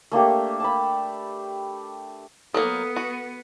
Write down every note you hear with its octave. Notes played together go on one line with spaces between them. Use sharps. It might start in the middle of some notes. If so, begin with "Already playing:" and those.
A3 A#3 D4 G4
A5 B5
F#3 A#3 B3 A4 A#4 F5 D#6
F#4